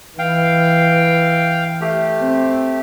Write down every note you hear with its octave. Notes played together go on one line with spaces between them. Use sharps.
E3 F5 G5
A3 G4
C4